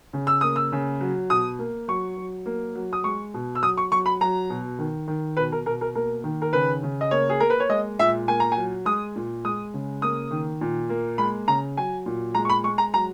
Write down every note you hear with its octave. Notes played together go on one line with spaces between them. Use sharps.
C#3
E6
A#3 D#6
E6
C#3
F#3
B2 D#6
A#3
F#3 C#6
F#3
A#3
F#3
D#6
G#3 C#6
B2
E6
F#3 D#6
C#6
F#3 C#6
B5
F#3 A#5
B2
D#3
D#3
B2 B4
A#4
B2 A#4
A#4
A#3 A#4
D#3
A#4
C#3 B4
C#3
D#5
A#3 C#5
G#4
A#3 A#4
B4
C#5
G#3 D#5
A#2 E5
A#3 G#5
A#5
F#3 G#5
G#3 D#6
A#2
G#3 D#6
C#3
A#3 D#6
D#3
A#2
A#3
G#3 B5
C#3 A#5
F#3 G#5
A#2
G#3 A#5
C#6
B5
G#3 C#6
A#5
F#3 A#5